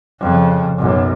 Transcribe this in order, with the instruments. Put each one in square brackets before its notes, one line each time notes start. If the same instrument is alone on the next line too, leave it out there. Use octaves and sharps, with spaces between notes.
[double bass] F2 C#3
B1 F#2